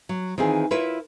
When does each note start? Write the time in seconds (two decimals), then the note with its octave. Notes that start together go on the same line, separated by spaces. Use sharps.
0.09 F#3
0.38 D#3 E3 C4 F4 G#4
0.71 E4 F4 A#4 B4 C#5 E5